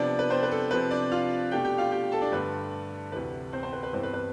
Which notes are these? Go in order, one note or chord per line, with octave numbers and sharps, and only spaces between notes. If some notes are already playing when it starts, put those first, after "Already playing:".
Already playing: C3 F3 B3 D4 D5
B4
C4 C5
B4
A4
C3 F3 C4 B4
D4 D5
F4 F5
B2 A3 D4 G4 G5
G4 G5
F4 F5
G4 G5
A4 A5
D4 D5
G2 D3 A3 D4 B4
D2 C3 E3 B4
C4 C5
C4 C5
B4
B4
G2 E3 G3 B3 C4 C5
B4
B4